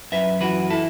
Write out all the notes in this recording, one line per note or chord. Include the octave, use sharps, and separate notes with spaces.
F#2 B4 E5
E3 F#4 B4
E4 A4